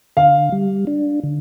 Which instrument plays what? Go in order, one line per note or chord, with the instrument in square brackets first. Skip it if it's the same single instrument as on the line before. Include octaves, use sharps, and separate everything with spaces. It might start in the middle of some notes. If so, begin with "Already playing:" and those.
[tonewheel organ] D3 [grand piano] F5
[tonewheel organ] G3
D4
D3